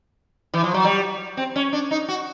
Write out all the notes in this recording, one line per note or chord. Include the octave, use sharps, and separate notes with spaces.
E3
F3
F#3
G3
C4
C#4
D4
D#4
F#4